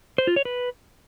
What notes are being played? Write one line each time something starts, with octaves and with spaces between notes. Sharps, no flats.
C5
F4
C#5
B4